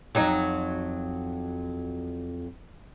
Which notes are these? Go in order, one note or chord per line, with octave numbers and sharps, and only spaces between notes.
F2 F#3 D#4